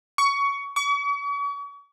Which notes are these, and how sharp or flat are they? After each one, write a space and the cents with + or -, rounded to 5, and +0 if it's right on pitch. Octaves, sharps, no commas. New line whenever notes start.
C#6 +20
C#6 +40